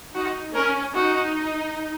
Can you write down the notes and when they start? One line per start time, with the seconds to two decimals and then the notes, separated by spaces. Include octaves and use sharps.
0.15 D#4 F#4
0.55 C#4 A#4
0.95 D#4 F#4